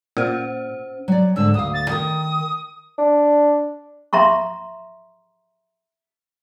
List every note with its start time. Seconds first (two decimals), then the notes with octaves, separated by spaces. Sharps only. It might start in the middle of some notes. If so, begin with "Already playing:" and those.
0.17 A#2 C#4 C5
1.08 F#3 D5
1.36 G#2 D3 E6
1.54 D2 F5 D#6
1.73 A6
1.89 D#3 A#4 D#6
2.98 D4
4.13 E5 A#5 C6 C#6